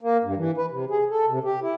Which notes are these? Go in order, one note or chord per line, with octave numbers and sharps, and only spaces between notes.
A#3
G2
E3
B4
C3
G#4
A4
C3
G4
E4